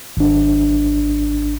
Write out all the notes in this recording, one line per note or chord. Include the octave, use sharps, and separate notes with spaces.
G#1 D4